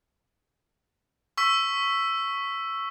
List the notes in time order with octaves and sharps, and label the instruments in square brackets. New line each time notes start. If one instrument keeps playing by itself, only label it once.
[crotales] C#6 E6 B6